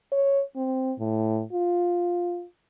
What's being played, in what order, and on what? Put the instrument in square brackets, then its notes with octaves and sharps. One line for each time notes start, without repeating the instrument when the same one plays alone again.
[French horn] C#5
C4
A2
F4